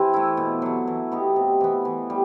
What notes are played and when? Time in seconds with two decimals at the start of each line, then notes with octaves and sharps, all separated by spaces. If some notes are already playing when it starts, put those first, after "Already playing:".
Already playing: E3 C4 G4
0.14 A3 E4
0.37 B2
0.62 F#3 A3
0.87 E3
1.12 B3 D#4 G4
1.36 C3
1.61 E3 B3
1.85 E3
2.10 G3